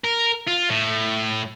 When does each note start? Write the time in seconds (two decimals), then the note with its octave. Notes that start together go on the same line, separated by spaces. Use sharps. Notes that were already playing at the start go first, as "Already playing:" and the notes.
0.04 A#4
0.48 F4
0.70 A2